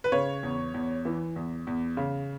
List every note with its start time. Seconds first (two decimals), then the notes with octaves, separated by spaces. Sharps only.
0.04 B4
0.12 C#3 C#5
0.43 E2
0.74 E2
1.05 E3
1.36 E2
1.67 E2
1.97 C#3